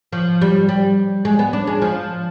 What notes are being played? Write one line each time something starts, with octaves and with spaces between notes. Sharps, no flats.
F3
G3
G3
G#3
B3
D4
G#3
F3